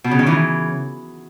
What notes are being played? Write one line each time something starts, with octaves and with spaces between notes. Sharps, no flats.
B2
C#3
D#3
C#3 E3